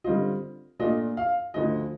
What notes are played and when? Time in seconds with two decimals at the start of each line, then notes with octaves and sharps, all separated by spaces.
0.04 D3 G3 C4 F4 D#5
0.79 A#2 A3 D4 F4 D#5
1.17 F5
1.54 D2 D3 F3 D#5